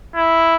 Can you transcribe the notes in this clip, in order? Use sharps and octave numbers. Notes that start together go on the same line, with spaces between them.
E4